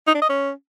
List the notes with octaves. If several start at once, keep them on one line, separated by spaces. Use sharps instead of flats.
D#4
D4
D#5
C#4